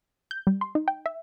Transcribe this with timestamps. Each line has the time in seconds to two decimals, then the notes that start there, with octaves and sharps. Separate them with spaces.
0.31 G6
0.47 G3
0.61 C6
0.75 D#4
0.88 G5
1.06 E5